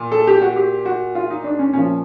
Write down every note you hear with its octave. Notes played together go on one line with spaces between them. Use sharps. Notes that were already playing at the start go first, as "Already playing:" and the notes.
Already playing: A#2
A4
G4
F#4
G4
F#4
F4
D#4
D4
C#4
A#2 F3 C#4